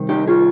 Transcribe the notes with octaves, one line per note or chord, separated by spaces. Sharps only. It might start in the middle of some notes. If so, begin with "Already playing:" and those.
Already playing: C3 D#3 G3
D#4 G4
F4 G#4